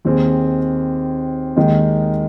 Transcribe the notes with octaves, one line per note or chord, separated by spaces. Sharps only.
D#2 D#3 C4 G#4
D#2 D#3 G#3 D#4